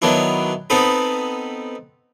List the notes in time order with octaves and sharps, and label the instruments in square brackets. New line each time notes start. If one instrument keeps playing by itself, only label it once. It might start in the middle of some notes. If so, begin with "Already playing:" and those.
[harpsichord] D#3 F#3 B3 D4 E4
B3 C4 D#4 A4 B5